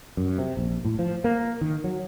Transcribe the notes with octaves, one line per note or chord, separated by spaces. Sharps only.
F#2
C3
A#1
A2
F3
A#3
D#3
F#3